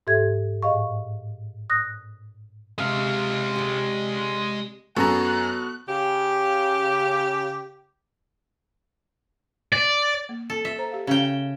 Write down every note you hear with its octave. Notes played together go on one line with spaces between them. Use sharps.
G#2 G4 A4 E5 G#6
A2 G#4 D#5 F5 C#6
D#6 F#6 A#6
C3 G#3 F5
G4 D5
F#2 B3 F#4 G#4 A4 A#5 F#6
C#3 G4
D5
A#3
A4
E5
C5 A#5
G4 F5
C#3 C#4 G4 F5 G5